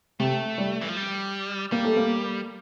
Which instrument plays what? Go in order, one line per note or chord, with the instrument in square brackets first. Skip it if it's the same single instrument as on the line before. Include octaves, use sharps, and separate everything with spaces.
[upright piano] C3 [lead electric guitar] A3
[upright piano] G3
[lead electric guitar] E3
F3
G3
[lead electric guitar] G3 [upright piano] A#3
[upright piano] A3
A#3